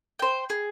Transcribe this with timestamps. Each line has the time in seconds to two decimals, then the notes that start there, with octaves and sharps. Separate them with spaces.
0.19 C5 G5
0.50 G#4